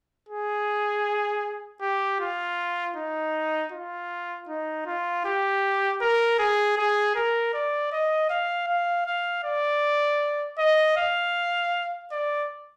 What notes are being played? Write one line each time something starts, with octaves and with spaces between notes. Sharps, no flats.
G#4
G4
F4
D#4
F4
D#4
F4
G4
A#4
G#4
G#4
A#4
D5
D#5
F5
F5
F5
D5
D#5
F5
D5